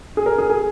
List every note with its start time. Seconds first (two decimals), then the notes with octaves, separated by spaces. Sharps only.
0.17 G#4
0.26 A#4
0.38 G#4
0.50 G#4